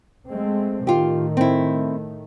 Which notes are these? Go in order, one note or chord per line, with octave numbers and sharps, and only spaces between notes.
G#3 A3 C4
A2 D#3 A3 F4 G4
C4 E4